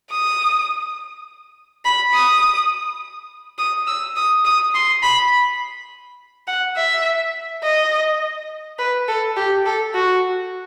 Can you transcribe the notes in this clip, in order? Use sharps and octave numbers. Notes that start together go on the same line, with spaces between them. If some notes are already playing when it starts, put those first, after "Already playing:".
D#6
B5
D#6
D#6
E6
D#6
D#6
C6
B5
F#5
E5
D#5
B4
A4
G4
A4
F#4